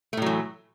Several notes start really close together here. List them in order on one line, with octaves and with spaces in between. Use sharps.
A3 A2 F#3 E3